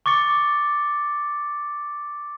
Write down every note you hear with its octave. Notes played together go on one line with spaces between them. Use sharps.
C#6 D6 A6 C#7